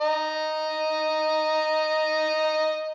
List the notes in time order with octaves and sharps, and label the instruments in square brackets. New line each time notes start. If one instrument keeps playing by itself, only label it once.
[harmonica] D#5 A#5